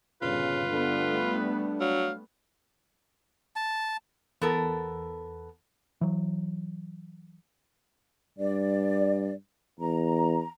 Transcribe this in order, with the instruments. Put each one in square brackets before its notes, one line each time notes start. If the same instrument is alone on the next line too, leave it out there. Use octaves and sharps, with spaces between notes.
[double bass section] G1 A#2 [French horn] C#3 [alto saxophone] F4 [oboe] B4
[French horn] D3 [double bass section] G3 A3 B3
[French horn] D4
[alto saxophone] F#3 [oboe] F5
[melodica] A5
[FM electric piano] E2 [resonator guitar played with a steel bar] B3 A4 A#4
[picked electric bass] E3 F#3
[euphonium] G2 [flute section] D5
[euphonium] E2 [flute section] A#5